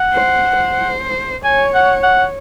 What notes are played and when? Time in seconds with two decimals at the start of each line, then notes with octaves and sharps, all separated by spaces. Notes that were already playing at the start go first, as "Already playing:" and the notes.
Already playing: F#5
0.13 C5
0.57 C5
1.44 C#5 G#5
1.74 F#5
2.03 F#5